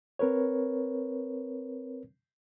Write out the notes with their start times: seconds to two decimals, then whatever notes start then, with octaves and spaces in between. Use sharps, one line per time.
0.19 C4 A#4 B4 C#5